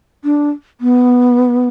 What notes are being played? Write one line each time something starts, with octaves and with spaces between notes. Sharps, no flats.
D4
B3